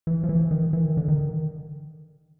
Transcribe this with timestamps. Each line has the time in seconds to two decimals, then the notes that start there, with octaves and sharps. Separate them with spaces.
0.07 E3
0.24 F3
0.29 E3
0.51 D#3
0.73 E3
0.85 D#3
0.97 D3
1.08 D#3